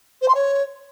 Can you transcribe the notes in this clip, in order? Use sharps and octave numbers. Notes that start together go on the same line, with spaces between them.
C5
C6
C#5